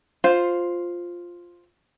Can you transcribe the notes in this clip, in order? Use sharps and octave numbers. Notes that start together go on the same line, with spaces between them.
F4 C5 F5